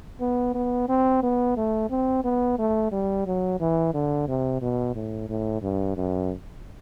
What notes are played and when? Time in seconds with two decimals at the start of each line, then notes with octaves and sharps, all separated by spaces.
0.21 B3
0.55 B3
0.89 C4
1.23 B3
1.57 A3
1.91 C4
2.24 B3
2.59 A3
2.92 G3
3.27 F#3
3.60 E3
3.94 D3
4.28 C3
4.62 B2
4.96 A2
5.29 A2
5.62 G2
5.97 F#2